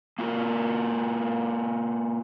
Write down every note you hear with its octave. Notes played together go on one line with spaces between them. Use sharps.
A#3 F4 F#4 A#4